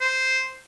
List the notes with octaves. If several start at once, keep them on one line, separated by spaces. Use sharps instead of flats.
C5